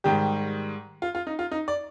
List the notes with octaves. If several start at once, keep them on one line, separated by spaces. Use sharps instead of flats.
G#2 D#3 G3 G4
F4
F4
D#4
F4
D#4
D5